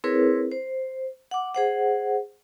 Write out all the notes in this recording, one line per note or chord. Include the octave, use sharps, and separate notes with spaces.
C4 E4 G#4 A#4 B4 C#5
C5
F#5 D6
G#4 C5 F#5